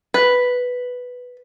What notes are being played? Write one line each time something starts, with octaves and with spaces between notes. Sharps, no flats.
B4